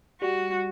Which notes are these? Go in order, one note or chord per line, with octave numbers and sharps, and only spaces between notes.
G3 F#4